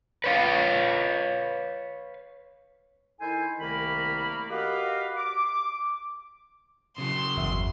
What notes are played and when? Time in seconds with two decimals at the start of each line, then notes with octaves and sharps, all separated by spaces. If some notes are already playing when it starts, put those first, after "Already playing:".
0.24 B4 C#5 F5
3.21 D#3 E4 A4 C5 G#5
3.60 C2 D#3 A3 A#3 B5
4.50 F#4 G4 A#4 B4 D#5 F5
5.17 D6
6.98 C#3 F#3 C6
7.36 G1 E2 E5